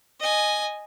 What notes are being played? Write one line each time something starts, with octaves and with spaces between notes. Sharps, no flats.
D#5 G#5